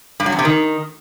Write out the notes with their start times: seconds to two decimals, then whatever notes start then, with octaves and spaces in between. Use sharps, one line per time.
0.20 G2
0.26 F#3
0.32 E2
0.39 C3
0.45 D#3